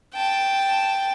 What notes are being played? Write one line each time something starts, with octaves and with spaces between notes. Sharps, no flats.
G5 A5